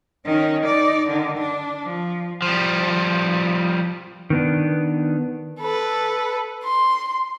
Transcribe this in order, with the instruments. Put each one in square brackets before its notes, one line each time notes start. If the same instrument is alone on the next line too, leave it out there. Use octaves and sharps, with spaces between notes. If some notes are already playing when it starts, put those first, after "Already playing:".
[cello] D#3 C#4
D#4 D5
D3 D#3
D4
F3
[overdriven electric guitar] F3 G3
[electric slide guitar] D#3 B3 D4
[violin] A4 B4
C6